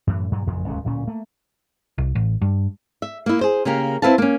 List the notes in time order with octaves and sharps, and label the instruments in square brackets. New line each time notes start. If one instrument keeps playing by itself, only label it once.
[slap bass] F#2 A2 E3
G2 A#2 F#3 A#3
A1 F2 C#3
D1 C#2 G#2 C#4
D1 A#2 C#4
A3 A#3
[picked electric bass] C2
A1
G2
[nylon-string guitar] E5
A#3 E4
G#4 C5
C#3 A#3 G4 A#4
C4 E4 B4 F5 A5
A#3 C#4